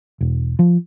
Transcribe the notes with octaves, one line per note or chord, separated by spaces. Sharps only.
E1
F3